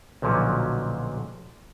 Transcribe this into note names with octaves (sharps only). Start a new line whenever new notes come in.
B1 A#2 D3 F3 F#3 C#4